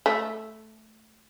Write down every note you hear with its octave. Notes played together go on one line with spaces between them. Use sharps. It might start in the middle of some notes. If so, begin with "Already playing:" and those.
A3